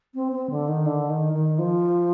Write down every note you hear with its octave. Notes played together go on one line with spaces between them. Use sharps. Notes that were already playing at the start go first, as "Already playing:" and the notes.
C4
C4
D3
D#3
D3
D#3
D#3
F3